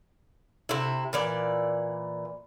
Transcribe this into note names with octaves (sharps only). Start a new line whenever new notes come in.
C3 E4
A#2 E3 D5